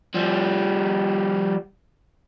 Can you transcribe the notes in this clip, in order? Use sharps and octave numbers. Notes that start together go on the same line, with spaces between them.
F3 G3